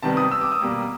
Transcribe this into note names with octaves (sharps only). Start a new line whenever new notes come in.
C3 D#3 G3 B3 A5
D#6
E6
D6
D#6
B2 G3 A#3